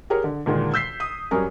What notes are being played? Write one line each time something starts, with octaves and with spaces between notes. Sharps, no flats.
G4 G#4 A#4 C#5
D3
D2 A#2 D#3 G#3
E6 G6 B6 C7
D#6
F#2 G3 C#4 A#4 G#5